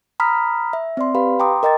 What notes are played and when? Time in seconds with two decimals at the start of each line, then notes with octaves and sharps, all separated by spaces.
0.20 A#5 B5 D#6 F6 B6
0.73 E5
0.97 C4 D5 C6
1.15 G4 B4 F5 B5
1.40 G5 A#5 C6 D6 D#6
1.63 A#4 D#5 G5 A#5 A6